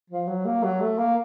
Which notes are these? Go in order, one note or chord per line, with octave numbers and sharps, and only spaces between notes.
F3
F#3
A#3
F#3
A3
A#3